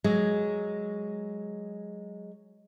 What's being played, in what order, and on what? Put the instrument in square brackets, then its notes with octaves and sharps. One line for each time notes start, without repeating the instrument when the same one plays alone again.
[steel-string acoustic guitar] F#3 G#3